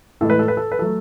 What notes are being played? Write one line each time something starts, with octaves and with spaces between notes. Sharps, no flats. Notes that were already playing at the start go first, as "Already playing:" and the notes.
A2 E3 G#3 A4
B4
A4
B4
A4
B4
F#3 A3 A4